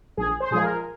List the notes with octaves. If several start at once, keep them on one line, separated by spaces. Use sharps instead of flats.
A#1 G#4
C5
A#2 F3 G#3 G#4
A#4